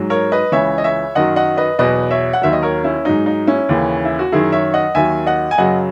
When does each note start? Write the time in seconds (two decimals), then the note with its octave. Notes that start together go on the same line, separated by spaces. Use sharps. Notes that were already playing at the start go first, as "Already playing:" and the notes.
Already playing: G#2 F#3
0.10 A#4 C#5
0.32 B4 D#5
0.52 C#2 C#3 E3 C#5 E5
0.78 D#5
0.84 C#5 E5
1.15 F#2 D#3 F#3 D#5 F#5
1.36 D#5 F#5
1.57 B4 D#5
1.79 E2 B2 F#3 B4 D#5
2.11 C#5 E5
2.33 F#5
2.42 D#2 D#3 F#3 E5
2.53 D#5
2.63 A#4 C#5
2.84 C#4 E4
3.05 G#2 F#3 D#4
3.26 D#4
3.47 C#4 E4
3.69 D#2 C#3 E3
4.05 E4
4.19 F#4
4.32 F#2 D#3 F#3 E4 G#4
4.52 C#5 E5
4.74 D#5 F#5
4.95 D#2 D#3 F#3 E5 G#5
5.26 D#5 F#5
5.51 G#5
5.58 F#2 C#3 F#3 D#5 F#5